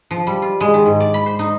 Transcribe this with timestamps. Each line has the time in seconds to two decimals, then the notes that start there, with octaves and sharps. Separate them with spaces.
0.11 F3
0.27 G3
0.42 F4
0.61 G#3
0.74 D#3
0.86 G#2
1.00 D5
1.14 B5
1.26 C5
1.39 D#4